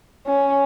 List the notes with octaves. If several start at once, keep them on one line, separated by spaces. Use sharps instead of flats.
C#4